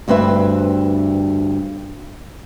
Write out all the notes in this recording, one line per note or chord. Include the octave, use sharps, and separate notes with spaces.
D2 G2 C4 B4 E5